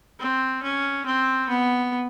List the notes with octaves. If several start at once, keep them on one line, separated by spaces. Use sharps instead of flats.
C4
C#4
C4
B3